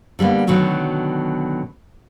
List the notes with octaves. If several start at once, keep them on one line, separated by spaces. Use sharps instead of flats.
D3 G3 A#3 B3
B2 D3 D#3 F#3 A3